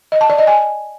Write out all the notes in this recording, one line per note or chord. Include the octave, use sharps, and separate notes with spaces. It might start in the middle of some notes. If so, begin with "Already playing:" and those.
D#5
A5
D5
D#5
G#5